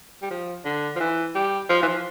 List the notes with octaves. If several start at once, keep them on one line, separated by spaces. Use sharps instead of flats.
G3
F3
D3
F3
E3
G3
F3
E3
F3